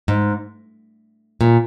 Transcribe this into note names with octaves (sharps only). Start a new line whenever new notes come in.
G#2
A#2